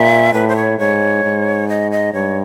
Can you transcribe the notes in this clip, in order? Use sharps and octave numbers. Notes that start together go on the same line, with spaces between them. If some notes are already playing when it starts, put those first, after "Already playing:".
Already playing: A#2 E5
A2 B4
C5
C#5
G#2 C#5
G#2
D#5
D#5
G2 C#5